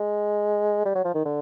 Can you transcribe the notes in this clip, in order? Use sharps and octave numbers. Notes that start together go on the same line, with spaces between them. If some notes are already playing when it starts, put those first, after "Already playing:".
Already playing: G#3
G3
F#3
F3
D#3
D3